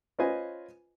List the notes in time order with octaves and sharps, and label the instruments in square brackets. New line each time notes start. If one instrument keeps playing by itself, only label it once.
[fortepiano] C#4 F4 B4 C5 D#5 G#5